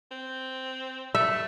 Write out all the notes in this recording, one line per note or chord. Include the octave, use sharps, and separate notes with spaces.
C4
A3 E5